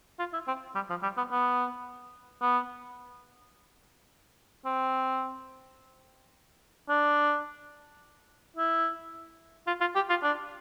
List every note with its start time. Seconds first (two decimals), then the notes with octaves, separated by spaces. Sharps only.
0.19 F4
0.33 E4
0.48 C4
0.75 G3
0.90 F3
1.03 G3
1.17 B3
1.32 B3
2.42 B3
4.65 C4
6.89 D4
8.56 E4
9.67 F4
9.81 F4
9.95 G4
10.10 F4
10.23 D4